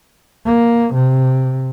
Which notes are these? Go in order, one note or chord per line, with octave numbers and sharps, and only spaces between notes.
A#3
C3